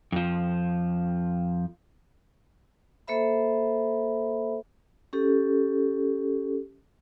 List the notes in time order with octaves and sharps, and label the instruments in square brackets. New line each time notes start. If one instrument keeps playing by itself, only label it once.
[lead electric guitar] F2 F3
[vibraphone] A#3 A4 C5 E5 B5
C#4 G4 A4